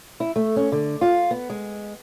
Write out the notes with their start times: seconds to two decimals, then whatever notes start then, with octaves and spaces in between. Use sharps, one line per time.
0.20 E4
0.36 A3
0.56 C#4
0.72 D3
1.01 F4
1.31 B3
1.50 G#3